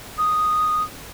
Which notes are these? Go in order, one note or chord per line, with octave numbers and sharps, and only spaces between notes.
D#6